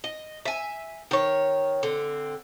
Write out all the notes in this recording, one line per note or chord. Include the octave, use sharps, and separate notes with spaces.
D#5
E5 G#5
D#3 C#5
D3 C4